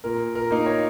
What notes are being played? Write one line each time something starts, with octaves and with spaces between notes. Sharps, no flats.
A#2 A#4
A#4
A#3 D#4
C#5